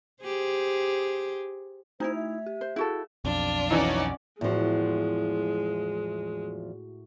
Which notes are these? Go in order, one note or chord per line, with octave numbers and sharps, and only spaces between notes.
G4 G#4 C5
A3 D#4 E4 C5 G#6
E5
G4
C5
E4 F#4 G#4 A4
B1 F2 D4 F4
E3 C#4 D#4 F#4 D5
E2 A2 F3 G#3 F#4